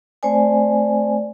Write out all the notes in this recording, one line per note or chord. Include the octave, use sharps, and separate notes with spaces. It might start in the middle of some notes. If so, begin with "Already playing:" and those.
A3 C4 C5 D5 G#5